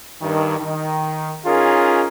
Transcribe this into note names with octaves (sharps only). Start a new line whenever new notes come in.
G2 D#3
D#3
C#4 D#4 F4 G#4 A#4